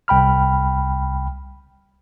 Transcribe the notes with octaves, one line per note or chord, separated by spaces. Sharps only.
C2 G5 B5 F6